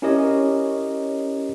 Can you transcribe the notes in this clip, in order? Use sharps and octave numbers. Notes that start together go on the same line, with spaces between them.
C#4 E4 G4 A#4 C#5 D#5